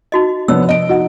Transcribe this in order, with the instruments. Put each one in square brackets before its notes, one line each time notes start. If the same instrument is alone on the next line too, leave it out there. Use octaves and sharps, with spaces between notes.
[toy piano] D#4 F#4 D#5
[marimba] C3 F3 [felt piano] B3 D4 C#5 [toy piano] E6
[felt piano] D#5 D7
[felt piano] D#4 [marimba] F#4 D#5 F#5